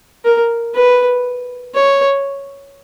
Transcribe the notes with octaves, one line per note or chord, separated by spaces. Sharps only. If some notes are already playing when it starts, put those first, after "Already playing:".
A#4
B4
C#5